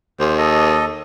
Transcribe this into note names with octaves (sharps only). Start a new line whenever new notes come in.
D#2 C5
A4 D#5